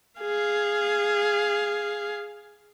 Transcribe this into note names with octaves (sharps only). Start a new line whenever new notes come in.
G#4 F5